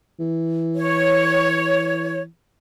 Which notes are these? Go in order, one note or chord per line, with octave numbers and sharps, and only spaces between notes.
E3
C#5